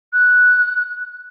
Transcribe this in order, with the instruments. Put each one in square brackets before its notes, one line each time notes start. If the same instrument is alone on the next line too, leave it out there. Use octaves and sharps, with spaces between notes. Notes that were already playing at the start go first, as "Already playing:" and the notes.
[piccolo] F#6